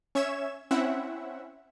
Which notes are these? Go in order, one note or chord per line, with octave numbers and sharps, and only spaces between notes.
C#4 C#5 E5 G#6 E7
C4 C#4 E4 E5 F#5